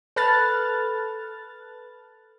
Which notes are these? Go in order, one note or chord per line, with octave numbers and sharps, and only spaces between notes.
A4 B4 F6 F#6 A6